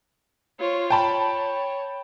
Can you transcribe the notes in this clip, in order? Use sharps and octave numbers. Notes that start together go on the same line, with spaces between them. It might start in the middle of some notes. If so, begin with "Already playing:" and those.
F4 C5 C#5
C#5 G5 A5 B5